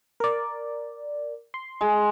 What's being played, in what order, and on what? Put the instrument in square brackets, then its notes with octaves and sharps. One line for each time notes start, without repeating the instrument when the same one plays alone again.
[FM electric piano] A#4 D5
C6
[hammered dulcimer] G#3